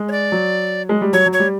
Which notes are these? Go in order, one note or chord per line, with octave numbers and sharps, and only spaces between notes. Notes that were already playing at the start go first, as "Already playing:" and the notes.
Already playing: G#3
C#5
D5
F#3
G#3
G3
F#3 C#5
F#3
C#5
G3